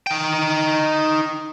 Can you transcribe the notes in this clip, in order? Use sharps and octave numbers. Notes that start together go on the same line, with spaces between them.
D#4 G5